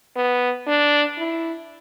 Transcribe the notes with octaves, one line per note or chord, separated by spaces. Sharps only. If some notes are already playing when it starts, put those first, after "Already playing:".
B3
D4
E4